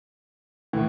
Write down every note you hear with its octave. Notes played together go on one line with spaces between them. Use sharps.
A2 E3